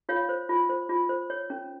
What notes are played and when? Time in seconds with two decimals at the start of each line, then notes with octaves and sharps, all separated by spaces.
0.09 F4 C#5 F5
0.29 C5
0.49 F4
0.69 C5
0.89 F4
1.09 C5
1.30 C#5
1.50 C#4